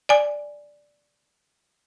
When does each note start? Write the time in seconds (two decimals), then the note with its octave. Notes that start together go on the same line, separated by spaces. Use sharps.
0.09 D5 G#5